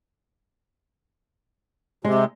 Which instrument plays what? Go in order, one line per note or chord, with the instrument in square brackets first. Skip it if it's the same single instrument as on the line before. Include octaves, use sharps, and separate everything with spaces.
[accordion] C3 [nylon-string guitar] G#3